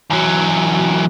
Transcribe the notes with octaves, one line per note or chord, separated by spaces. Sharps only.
E2 F#3